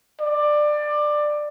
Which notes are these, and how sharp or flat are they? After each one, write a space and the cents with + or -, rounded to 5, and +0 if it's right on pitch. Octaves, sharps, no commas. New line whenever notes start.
D5 +15